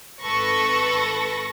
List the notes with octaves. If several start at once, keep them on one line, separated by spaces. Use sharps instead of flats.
G#1 A4 B4 B5 C#6 A#6